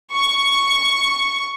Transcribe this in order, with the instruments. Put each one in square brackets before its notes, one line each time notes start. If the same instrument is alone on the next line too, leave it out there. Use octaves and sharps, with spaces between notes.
[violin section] C#6